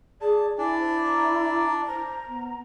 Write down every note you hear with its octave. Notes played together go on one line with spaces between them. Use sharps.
G#4 D5 A5
D4 E4 D5 G#5
C5
A#5
C5 A#5
B3